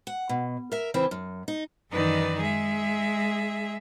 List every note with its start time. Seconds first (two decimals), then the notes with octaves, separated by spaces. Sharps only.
0.07 F#5
0.29 B2
0.72 A#4 E5
0.94 C#3 E3 C4
1.11 F#2
1.48 D#4
1.90 F#2 D#3 E3 D#4 B4 D5
2.40 G#3 G#4 E5